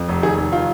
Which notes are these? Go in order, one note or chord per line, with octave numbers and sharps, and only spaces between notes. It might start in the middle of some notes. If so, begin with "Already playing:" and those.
Already playing: F2
F1
D#3 G#4
F1
D#3 F4